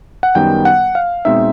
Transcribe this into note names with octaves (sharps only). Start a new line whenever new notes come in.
F#5
F#2 D#3 G3 B3 G5
F#5
F5
B2 G#3 C4 D#4 E5